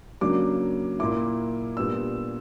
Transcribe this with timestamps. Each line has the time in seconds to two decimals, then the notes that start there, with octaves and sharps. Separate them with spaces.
0.21 C#3 F#3 A#3 D4 D6
0.99 A#2 A#3 E4 D6
1.77 A#2 G3 B3 D4 E6